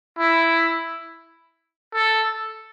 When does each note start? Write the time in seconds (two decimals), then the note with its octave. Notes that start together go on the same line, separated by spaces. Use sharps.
0.18 E4
1.95 A4